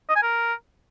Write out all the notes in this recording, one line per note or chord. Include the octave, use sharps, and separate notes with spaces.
D#5
G#5
A#4